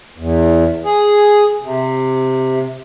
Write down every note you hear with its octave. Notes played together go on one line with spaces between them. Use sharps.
E2
G#4
C3